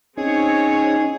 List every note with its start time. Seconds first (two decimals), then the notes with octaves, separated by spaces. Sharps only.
0.17 C4 C#4 D#4 G#4 C#5